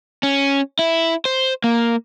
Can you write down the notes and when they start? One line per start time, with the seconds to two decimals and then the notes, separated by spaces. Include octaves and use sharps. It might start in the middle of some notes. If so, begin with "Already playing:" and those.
0.23 C#4
0.79 E4
1.25 C5
1.64 A#3